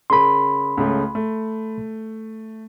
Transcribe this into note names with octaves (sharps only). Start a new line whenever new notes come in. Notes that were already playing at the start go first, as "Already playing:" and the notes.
C#3 G#4 A#4 B5 C6
C#2 C#3 A3
A3